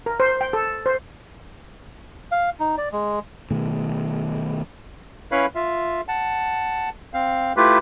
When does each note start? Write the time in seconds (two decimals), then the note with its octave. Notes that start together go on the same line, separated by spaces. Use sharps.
0.06 A#4
0.20 C5
0.41 G5
0.53 A4
0.86 C5
2.32 F5
2.60 D#4
2.78 D5
2.92 G#3
3.51 B2 D#3 A3
5.32 C#4 E4 B4 C#5 F5 B5
5.55 F4 E5
6.08 F#5 A5
7.14 C4 F5
7.57 A3 E4 F4 G4 B4